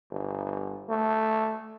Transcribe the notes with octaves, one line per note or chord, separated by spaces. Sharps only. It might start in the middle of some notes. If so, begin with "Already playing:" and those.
G1
A3